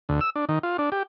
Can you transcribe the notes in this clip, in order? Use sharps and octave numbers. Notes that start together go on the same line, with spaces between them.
D2
E6
D4
D#3
F4
D4
G4